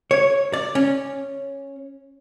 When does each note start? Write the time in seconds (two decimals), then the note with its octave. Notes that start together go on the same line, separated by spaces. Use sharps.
0.11 C#5
0.53 D5
0.75 C#4